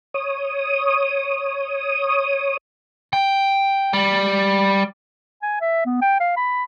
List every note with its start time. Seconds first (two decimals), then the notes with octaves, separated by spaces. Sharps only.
0.14 C#5 D#6
3.13 G5
3.93 G3
5.43 G#5
5.61 E5
5.86 B3
6.02 G5
6.20 F5
6.37 B5